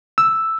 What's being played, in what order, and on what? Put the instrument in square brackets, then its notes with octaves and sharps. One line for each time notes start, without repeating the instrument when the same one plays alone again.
[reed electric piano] E6